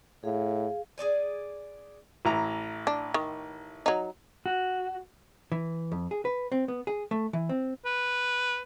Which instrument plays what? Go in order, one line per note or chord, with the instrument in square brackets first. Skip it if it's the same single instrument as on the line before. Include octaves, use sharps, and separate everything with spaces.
[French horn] A2 [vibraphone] G#4 F5
[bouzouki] G#4 A4 D5 G#5
[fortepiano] A1 E4 A#5
[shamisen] D4
D#3
F#3 D#4
[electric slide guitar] F#4
[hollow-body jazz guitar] E3
F2
G#4
B4
C4
B3
G#4
A3
E3
C4
[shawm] B4